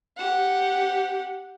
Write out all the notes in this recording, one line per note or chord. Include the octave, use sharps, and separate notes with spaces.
G4 F#5